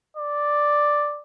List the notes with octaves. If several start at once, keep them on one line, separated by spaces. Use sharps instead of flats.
D5